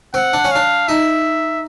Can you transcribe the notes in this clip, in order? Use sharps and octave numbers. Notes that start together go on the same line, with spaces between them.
C4 F#5
D4
C#4
D4 F5
D#4 E5